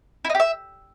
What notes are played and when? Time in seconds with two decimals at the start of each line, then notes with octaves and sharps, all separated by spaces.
0.25 E4
0.30 D#4
0.35 G4
0.40 E5